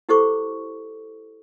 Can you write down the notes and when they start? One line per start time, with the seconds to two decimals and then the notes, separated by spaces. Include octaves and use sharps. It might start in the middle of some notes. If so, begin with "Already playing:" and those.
0.09 E4 G4 A4 C5 C#6 D6